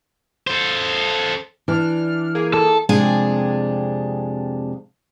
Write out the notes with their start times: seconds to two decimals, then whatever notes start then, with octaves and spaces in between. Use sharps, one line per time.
0.47 A4 C5
1.68 E3 D4 F6
2.35 A#3 G#4
2.54 A4
2.89 F2 C3 G#3 D4 G#4 G#5